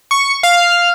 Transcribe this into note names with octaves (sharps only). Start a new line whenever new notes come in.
C#6
F5